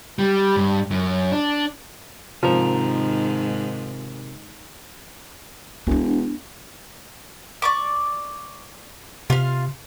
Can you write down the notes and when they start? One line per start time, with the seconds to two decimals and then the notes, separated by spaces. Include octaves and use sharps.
0.19 G3
0.56 G2
0.91 F#2
1.32 D4
2.43 G#2 C3 D#3 F3 A#4
5.87 E1 B3 D4
7.62 D5 C#6 D6
9.30 C3 F4 F5